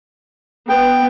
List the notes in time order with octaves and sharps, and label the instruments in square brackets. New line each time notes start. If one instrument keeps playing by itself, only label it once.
[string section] B3 [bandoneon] G5